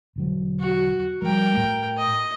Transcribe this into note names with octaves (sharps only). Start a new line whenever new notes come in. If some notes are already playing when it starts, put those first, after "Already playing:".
E1 D3 F#3
F#4
F3 G3 A#4 G5
A2 A3
D#5